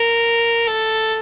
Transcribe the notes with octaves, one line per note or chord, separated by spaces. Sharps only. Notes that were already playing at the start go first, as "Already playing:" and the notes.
Already playing: A#4
A4